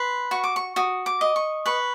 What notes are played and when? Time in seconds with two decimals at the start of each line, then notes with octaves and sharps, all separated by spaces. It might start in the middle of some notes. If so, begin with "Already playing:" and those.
Already playing: B4 C6
0.31 F#4 C#6
0.44 D6
0.56 C#6
0.76 F#4 D#6
1.06 D6
1.21 D#5
1.36 C#6
1.66 B4 C#6